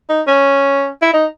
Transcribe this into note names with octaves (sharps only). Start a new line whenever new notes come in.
D#4
C#4
E4
D#4